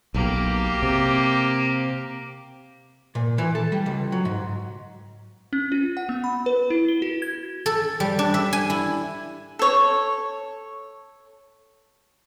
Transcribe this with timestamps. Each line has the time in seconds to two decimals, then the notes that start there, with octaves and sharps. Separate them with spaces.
0.14 B1 B2 A#3 G4
0.83 C3
3.15 A#2
3.38 E3
3.55 A4
3.72 G3
3.86 C#2
4.12 F#3
4.25 G#2
5.53 C#4
5.72 F4
5.97 F#5
6.09 B3
6.24 B5
6.46 B4
6.70 E4
6.88 G7
7.02 F#4
7.22 G#6
7.66 A4
8.00 G3
8.19 D4
8.34 E5
8.53 G#5
8.70 E4
9.59 A4 C#5